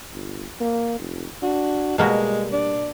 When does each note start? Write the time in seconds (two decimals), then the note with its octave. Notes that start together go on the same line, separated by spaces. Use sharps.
0.13 G1
0.61 A#3
0.99 F1
1.43 D4 F#4
1.98 B2 G3 G#3 A#3 F#4
2.52 D4